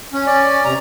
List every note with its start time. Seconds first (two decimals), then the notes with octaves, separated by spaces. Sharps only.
0.13 C#4
0.27 D5
0.65 C3 A#5